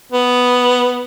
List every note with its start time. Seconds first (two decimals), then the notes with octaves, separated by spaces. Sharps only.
0.12 B3